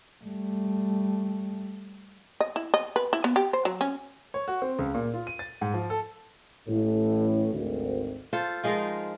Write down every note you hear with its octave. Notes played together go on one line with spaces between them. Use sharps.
G3 A3
D#5
E4
D#5
B4
E4
B3
G4
C5
F#3
C#4
C#5
F#4
C4
C#2
A#2
F4
D#7
A6
G#2
F3
A4
A1 A2
G#1 D2
F4 A4 C5
F3 G#3 D#4 A#4